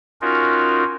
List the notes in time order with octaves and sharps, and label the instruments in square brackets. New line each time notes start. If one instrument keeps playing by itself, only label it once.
[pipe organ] C#4 D#4 F4 F#4 A#4